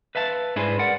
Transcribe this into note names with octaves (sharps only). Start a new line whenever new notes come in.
B4 E5 F5 A5
G#2 D4 E4 G#4 B4 C5
A#4 D5 F#5